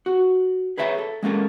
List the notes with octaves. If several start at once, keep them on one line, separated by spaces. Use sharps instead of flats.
F#4
G#4 B4 C#5 E5 G5 A#5
A4
G#3 A#3 C#4 A4 A#4